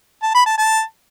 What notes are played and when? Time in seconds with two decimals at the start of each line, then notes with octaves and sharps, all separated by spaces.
0.23 A5
0.34 B5
0.46 A5
0.58 A5